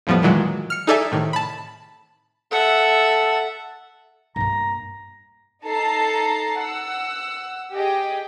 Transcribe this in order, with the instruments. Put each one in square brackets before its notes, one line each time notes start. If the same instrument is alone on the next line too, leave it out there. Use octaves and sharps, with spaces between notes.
[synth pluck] F2 A2 F3 G3 B3
A#2 D#3 E3 F#3 G#3
F6 C#7
D#4 G#4 A4 D5 E5 G#5
A2 C3 D#3
A5 B5
[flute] A4 [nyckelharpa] E5 F#5
[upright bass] G2 A#3 [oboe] A#5
[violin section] D#4 A4 A5 A#5 C7
F#5 E6
G4 G#4 D#5 G5